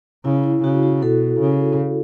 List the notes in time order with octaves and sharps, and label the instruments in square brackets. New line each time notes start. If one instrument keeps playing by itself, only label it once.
[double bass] C#3 [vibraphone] E4
[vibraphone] E4
[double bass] C#3 [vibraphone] F#4
[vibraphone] F#4
[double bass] B2 [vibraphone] A4
[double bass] C#3